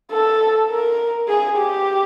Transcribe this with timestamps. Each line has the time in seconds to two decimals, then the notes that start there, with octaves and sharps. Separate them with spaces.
0.12 A4
0.70 A#4
1.28 G#4
1.57 G4